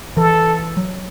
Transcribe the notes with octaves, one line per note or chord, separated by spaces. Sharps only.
E3 A4
F#3